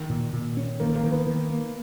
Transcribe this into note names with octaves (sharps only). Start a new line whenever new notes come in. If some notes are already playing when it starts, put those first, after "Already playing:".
Already playing: D#3
A#2
A#2
C#4
D#3 A#3
A#3
D#3
B3
D#3
A#3